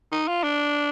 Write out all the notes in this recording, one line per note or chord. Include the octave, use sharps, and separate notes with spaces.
D#4
F4
D4